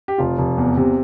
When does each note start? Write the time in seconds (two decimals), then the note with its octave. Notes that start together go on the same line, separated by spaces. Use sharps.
0.08 G4
0.18 F1 F4
0.38 F1
0.58 E2
0.77 C3